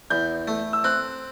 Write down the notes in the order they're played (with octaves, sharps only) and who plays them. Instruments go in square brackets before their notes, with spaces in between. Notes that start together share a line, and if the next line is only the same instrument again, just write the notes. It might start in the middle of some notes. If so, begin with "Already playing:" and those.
[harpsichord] E2 [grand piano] G6
[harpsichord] A3
[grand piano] E6
[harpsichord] C4 [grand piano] F#6